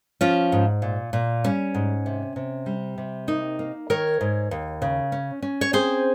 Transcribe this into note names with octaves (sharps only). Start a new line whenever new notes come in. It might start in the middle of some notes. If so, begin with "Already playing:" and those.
F3 C#4 F4
G#2
A#2
A#2
G3 C#4
G#2
C3
C3
G3
C3
A#3 D#4
A#3
D#3 A#4 C#5
G#2
D#2
C#3
C#4
C#4
C#5
C4 G#4 C5